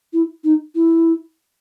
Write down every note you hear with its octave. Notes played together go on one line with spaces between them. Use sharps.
E4
D#4
E4